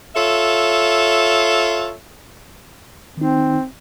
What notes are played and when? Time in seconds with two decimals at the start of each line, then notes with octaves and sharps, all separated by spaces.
0.15 F4 A4 C#5 E5
3.17 D#3 C4 D#4